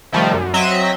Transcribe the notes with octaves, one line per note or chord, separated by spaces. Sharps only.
C3 D#3 F3 G3 A3
F#2
F#3 C4 D#5 E5